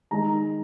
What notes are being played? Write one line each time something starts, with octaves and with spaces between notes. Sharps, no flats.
D#3 G#3 A#5